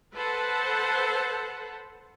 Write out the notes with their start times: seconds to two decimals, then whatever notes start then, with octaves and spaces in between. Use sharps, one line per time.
0.14 A4 B4 C5 F#5 A5